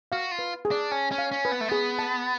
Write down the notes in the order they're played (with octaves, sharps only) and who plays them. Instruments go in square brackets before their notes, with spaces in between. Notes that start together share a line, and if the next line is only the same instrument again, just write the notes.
[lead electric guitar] F#4 [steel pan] F5
[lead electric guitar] F4
[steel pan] B4
G#4
[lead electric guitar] D4
[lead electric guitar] C#4 [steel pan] A5
[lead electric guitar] C#4
[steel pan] F5
[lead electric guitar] C#4
[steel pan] B4
[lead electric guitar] B3
A3
[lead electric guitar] B3 [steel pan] G#4
[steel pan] A5